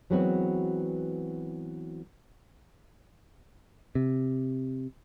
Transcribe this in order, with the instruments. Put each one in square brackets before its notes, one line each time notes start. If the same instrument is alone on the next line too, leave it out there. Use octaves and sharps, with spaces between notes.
[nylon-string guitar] E3 F#3 G#3 B3 C4 F#4
[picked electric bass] C3